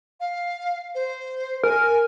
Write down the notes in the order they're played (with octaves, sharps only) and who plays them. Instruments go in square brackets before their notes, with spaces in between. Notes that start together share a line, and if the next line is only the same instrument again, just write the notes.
[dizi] F5
C5
[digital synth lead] A#4 [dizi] G#5